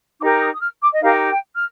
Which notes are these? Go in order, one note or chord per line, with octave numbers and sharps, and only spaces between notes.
D#4 G4 A#4 D6
D#6
D#6
F6
D6
D#5
D#4 G4 A#4 F5
G5
F6